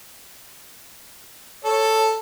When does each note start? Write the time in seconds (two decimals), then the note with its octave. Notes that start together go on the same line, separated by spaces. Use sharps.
1.65 A4 C#5